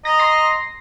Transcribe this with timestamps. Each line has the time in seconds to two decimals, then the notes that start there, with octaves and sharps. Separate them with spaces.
0.05 D#5 A#5 A#6
0.19 C6 A#6 C7